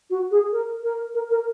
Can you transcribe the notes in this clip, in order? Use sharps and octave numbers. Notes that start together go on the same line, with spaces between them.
F#4
G#4
A#4
A#4
A#4
A#4